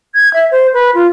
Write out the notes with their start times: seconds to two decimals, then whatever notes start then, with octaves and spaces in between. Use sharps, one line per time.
0.15 G#6
0.33 E5
0.52 C5
0.74 B4
0.94 F4